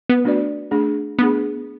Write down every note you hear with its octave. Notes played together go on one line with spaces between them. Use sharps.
B3
A3 D4 F#4 B4 D5
A3 D4 G#4
A3 B3 D4 G#4